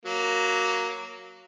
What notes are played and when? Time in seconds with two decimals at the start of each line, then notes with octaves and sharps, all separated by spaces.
0.05 F#3 A#3